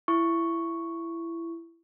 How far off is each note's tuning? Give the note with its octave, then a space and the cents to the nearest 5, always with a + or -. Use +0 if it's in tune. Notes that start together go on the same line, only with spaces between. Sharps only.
E4 +20 C#6 +0